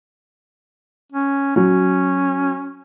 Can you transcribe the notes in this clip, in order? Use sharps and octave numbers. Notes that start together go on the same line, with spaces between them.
C#4
F#3 C#4